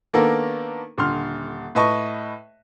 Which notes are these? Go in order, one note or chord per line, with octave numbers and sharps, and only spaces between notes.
D#3 A#3 B3 D4 A4 A#4
D#1 D3 C6 F6
A2 B4 D#5 A5 C#6